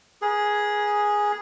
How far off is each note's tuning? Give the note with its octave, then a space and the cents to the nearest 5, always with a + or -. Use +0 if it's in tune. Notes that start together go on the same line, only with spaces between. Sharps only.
G#4 +0 B4 -45